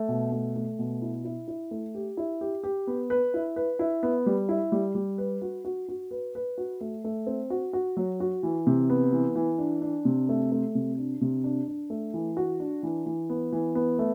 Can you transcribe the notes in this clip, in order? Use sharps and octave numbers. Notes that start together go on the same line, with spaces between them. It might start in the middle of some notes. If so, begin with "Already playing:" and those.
Already playing: A3
B2
A3
A3
B2
E4
E4
E4
A3
G4
E4
G4
G4
B3
B4
E4
B4
E4
B3
G3
E4
G3
G3
B4
F#4
F#4
F#4
B4
B4
F#4
A3
A3
C4
F#4
F#4
F#3
F#4
E3
C3
B3
E3
E3
D4
D4
C3
A3
A3
C3
D4
C3
D4
D4
A3
E3
F#4
D4
E3
E3
B3
E3
B3
A3